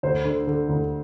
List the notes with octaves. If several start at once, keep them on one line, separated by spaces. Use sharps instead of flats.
D2 C5
D3
D3
D2